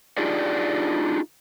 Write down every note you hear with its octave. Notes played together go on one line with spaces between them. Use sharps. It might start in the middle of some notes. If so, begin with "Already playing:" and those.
D4 D#4 F4 G4 G#4 D5